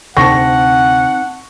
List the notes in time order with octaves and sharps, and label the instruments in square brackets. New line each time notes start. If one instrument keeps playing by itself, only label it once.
[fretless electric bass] D2 C3 [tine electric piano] C4 D#4 A5 [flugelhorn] F#5 [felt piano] C#6 A#6